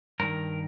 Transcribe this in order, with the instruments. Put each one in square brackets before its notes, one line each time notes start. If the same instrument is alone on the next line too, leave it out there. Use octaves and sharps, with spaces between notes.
[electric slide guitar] G2 D#3 A#4